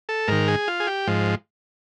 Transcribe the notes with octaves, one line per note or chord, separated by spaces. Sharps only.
A4
G#2 D#3 A#4
G#4
F4
G#4
G4
G#2 F3